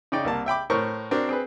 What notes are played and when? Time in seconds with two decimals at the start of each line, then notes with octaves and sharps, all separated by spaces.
0.12 C#3 D#4 D5 G5
0.25 C2 A#3 A5
0.46 E5 G5 B5 D6
0.70 A2 A#4 C5 C#6
1.11 C4 D4 F#4 A#4 C5
1.29 C4 G#4 B4